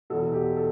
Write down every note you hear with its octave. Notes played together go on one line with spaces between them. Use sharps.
E2 B2 A4
G4
A4